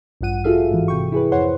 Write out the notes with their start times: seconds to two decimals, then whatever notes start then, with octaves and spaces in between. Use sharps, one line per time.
0.21 A1 G2 F3 F#5 D#7
0.44 F4 F#4 G#4 A4 E5 F5
0.71 G#2 E3
0.88 C3 G5 C#6
1.12 E4 G#4 B4
1.32 F2 C5 C#5 F#5 C6